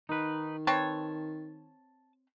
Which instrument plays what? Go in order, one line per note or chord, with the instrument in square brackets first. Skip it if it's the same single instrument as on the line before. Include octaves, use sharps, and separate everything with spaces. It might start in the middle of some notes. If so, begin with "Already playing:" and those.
[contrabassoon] D#3 [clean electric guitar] D#4 B4
[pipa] C4 B4 C#5 [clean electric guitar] A5